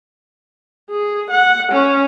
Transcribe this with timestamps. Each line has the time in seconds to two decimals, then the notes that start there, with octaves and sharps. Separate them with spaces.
0.91 G#4
1.31 F#5
1.72 C#4